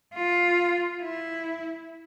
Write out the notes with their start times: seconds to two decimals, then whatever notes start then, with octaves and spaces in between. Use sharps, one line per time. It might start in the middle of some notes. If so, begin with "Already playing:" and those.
0.14 F4
1.02 E4